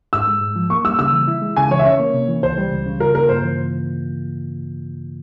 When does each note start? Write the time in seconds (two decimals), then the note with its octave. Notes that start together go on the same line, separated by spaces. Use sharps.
0.13 G#2 E6
0.27 G#3
0.41 G#2
0.56 F3
0.70 A#3 C#6
0.85 G3 E6
0.99 C#3 E6
1.13 E3
1.28 E4
1.42 G#3
1.57 C#3 G#5
1.71 E3 C#5
1.79 E5
1.85 C#4 C#5
2.00 A#3
2.14 C3
2.28 E3
2.43 C#2 C5
2.58 G3
2.72 C#2
2.86 C#3
3.00 F4 A#4
3.14 A#3 A#4
3.29 G2 C5
3.43 E3